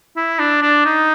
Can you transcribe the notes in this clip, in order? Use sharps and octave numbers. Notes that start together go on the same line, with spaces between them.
E4
D4
D4
D#4